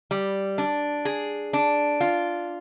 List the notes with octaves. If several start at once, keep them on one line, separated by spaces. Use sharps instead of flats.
G3
D4
G#4
D4
F4